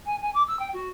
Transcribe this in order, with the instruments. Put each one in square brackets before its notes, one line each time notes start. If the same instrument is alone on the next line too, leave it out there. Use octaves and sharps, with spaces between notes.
[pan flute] G#5
G#5
D6
E6
G5
F#4